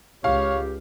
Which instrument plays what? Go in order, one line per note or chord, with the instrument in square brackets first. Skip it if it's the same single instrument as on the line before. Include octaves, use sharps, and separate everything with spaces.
[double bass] C#2 [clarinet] G4 [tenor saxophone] C#5 [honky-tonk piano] F5